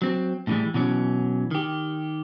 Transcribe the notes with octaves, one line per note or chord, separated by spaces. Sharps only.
F#3 C4
A2 D3 E3 G3 G#3
B2 E3 F#3 C#4
D#3 G4